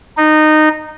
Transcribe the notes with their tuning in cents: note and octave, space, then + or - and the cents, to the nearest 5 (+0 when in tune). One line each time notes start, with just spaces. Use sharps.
D#4 -15